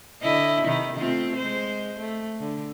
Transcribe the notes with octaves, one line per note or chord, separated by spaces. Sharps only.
D3 E4 D#5
C3 D#3 E4
A3 C4 F4
G#3 C5
A3
D3